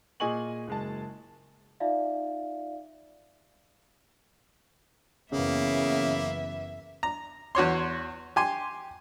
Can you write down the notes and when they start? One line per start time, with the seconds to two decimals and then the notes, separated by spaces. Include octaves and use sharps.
0.20 A#2 G#4 D#5 G#5 C#6 F#7
0.67 F#1 G#3 A5
1.80 D#4 F4 D5 E5 F5
5.32 F#1 C#3 E3 A#3 B3 E5
7.03 A#5
7.55 E2 F#4 C#5 C6
8.36 G4 G#5 C6